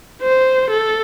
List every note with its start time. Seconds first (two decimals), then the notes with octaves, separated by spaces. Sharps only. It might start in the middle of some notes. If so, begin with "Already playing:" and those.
0.22 C5
0.71 A4